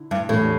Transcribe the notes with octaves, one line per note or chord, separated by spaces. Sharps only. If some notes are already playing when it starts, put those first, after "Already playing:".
Already playing: D3 E4
G2
E2 A2 E3 G3 D4